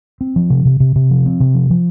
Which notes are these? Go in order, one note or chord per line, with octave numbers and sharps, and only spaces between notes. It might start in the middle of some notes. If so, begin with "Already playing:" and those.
C4
F3
C3
C3
C3
C3
F3
C4
C3
F3
F3